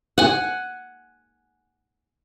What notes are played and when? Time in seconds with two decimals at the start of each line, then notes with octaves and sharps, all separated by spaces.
0.18 F#5 G#5